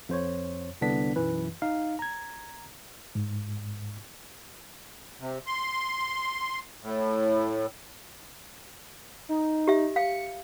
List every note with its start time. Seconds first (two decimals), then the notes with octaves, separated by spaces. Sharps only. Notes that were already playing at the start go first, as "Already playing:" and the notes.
0.09 F2 C5 C#5
0.81 C2 D3 B3 D4 B6
1.16 B1 F#2 E3 B4
1.62 D#4 F5
1.99 A#5 G#6
3.15 G#2
5.20 C3
5.47 C6
6.82 A2
9.29 D#4
9.68 G4 E5
9.96 F5 C#7